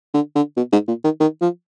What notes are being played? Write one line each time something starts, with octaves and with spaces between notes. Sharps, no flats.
D3
D3
B2
G#2
A#2
D#3
D#3
F3